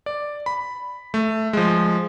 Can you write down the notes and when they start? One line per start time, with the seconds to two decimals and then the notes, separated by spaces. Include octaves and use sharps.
0.06 D5
0.46 B5
1.14 A3
1.53 F3 G#3